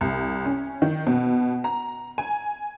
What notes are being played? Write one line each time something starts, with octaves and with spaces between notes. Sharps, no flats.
C2
C#4
D#3
B2
A#5
G#5